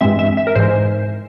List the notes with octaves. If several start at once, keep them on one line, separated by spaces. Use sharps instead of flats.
G2 E3 G#3 C4 E5
E5
E5
A#4
G#2 E3 G#3 C5